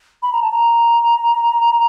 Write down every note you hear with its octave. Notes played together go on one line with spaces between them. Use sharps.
B5
A#5
A5
A#5